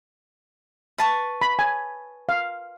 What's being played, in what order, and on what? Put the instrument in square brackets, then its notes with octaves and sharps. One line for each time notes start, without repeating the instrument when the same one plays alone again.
[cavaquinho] B4 A5 C#6
[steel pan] B5
G#5
F5